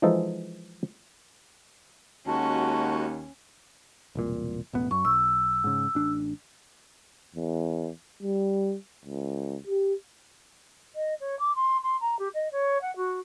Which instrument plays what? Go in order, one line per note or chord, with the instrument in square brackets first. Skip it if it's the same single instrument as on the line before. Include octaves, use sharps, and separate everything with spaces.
[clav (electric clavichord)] E3 F3 G#3 D#4 A4
[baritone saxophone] D#2 [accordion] G#3 F#4 [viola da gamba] C#4 [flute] A5
[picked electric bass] E1 C2 A#2
E1 A1 B3
[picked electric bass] F#2 [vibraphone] C#6
[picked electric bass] B1 [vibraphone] E6
[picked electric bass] G#2 C#3
A1 D4
[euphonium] E2
G3
C#2
G4
[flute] D#5
C#5
D6
C6
C6
A#5
G4
D#5
C#5
F#5
F#4